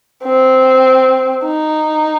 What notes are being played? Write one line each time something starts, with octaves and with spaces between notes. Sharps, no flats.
C4
D#4